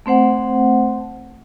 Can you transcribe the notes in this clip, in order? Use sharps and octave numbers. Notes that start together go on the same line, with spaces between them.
A3 C4 C5 F#5